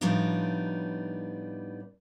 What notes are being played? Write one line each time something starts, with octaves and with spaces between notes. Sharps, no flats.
A2 F3 G3 B3 D4 D#4